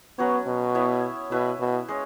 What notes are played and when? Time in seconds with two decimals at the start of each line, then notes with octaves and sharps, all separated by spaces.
0.18 F#3 B3 C#4 F#4 C#5
0.47 B2
0.75 B3 E4 C#5 E5
1.31 B2 E4 B4 E5
1.60 B2
1.88 G#3 C#4